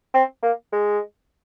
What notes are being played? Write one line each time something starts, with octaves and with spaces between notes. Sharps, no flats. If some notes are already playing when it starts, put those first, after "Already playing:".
C4
A#3
G#3